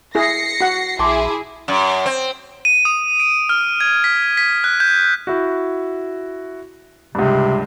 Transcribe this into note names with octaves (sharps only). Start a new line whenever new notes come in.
E4 G#4 A#6 C7 C#7
F#4 F#5
A#1 E4 G#4 A5 C6 D6
F#2
C4
D#7
D#6
D7
F6
G#6
B6
B6
F#6
G6
E4 F#4
C#2 G2 C3